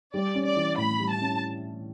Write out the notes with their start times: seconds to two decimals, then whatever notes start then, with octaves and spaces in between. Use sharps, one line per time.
0.14 G3 D5
0.35 C#4
0.45 D5
0.56 E3
0.78 A2 B5
0.99 G3
1.10 A5
1.21 C#4